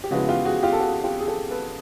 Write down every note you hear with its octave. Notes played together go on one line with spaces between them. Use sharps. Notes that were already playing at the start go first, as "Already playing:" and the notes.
G4
C#3 F3 G#3 B3 E4 F#4
F4 G4
F#4 G#4
F4 G4
A4
F#4 G#4
F4 G4
G#4
G4 A4
A4 B4